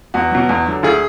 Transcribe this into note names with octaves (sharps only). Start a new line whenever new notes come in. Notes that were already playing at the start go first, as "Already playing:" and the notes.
E2 F#4
B2 F#3
E2
D3 F#3
D2 G#4